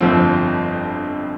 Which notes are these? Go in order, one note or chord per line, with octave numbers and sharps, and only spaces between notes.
G1 F2 F3 C4